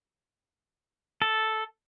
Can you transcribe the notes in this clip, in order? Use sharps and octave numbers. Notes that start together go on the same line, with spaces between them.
A4